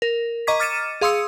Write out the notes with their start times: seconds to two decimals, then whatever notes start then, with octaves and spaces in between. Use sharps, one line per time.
0.02 A#4
0.47 D#5 A#5 C#6 D6 G#6 B6
0.59 D6 F6 A6 C#7 D#7 E7
1.01 G#4 F5 C6 D#6 E6 C#7